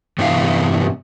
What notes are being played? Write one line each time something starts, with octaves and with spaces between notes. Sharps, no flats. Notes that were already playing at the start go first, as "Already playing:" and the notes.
G2 C3 E3 B3 E4 F5